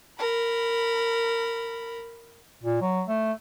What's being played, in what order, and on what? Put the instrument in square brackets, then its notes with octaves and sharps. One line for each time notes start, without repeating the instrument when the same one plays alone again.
[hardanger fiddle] A#4 B5
[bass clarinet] A#2
F#3
A3